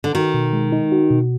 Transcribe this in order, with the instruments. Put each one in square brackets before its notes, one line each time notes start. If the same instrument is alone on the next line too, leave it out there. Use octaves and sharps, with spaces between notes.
[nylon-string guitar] D3
[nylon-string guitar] D#3 [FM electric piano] F#4
[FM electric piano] B2
G#3
D#4
F#4
B2